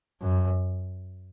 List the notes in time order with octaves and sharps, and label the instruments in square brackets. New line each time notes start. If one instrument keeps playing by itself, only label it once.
[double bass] F#2